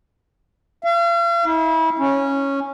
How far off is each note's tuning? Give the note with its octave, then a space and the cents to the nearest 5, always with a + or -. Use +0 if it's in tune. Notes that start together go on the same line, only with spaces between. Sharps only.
F5 -40
E4 -35
C#4 -5